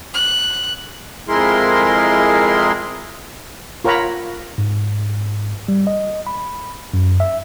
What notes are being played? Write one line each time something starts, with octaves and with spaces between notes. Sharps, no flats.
F#6
F2 G#3 E4 G#4 A#4 C6
F4 A#4 C#5 F#5 A#5 B5
G#2
G3
D#5
B5
F#2
E5